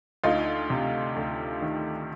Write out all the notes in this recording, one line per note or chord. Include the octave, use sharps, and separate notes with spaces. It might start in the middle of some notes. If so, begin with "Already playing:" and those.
D2 D#4 F4
C3
D2
D#3